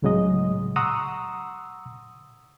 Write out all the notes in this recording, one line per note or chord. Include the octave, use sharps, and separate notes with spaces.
C#2 A2 C#3 F#3 G#3 D#5
F#5 A#5 C6 C#6 D#6 E6